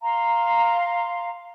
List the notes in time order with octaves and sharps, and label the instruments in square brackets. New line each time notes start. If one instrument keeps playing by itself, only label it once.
[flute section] F5 A#5 C6